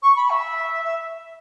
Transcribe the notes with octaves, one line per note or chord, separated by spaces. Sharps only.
C#6
B5
E5
E5